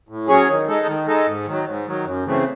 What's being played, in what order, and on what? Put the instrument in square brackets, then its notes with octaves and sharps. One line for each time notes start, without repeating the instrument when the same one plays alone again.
[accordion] A2
F#3 C#4 G#4 C#5
D#3
G#3 D#4 A4
D#3
G#3 D#4 A4
G#2
D#3 F#3
G#2
D#3 F#3
F#2
C#3 E3 A3 C4